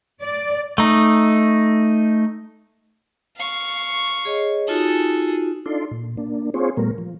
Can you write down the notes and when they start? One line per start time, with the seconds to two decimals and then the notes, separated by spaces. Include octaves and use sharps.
0.22 D5
0.78 A3 D#4
3.37 F5 C#6
4.25 G#4 C#5 D#5
4.68 D#4 F4 F#4 G#4 A4
5.66 D4 D#4 F4 A4 D5 C6
5.91 A#2
6.17 A#3 D4
6.54 C4 F4 G#4 C5 C#5
6.77 A#2 G3 A3 B3 A#4
6.98 F3